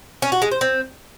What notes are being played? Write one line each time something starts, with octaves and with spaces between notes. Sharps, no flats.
C#4
F#4
G#3
C5
C4